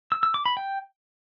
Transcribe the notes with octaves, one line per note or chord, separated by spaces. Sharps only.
E6
E6
D6
B5
G5